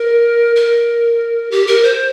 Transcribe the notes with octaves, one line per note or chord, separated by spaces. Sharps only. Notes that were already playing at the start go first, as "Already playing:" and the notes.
Already playing: A#4
A#4
G4
A#4
C5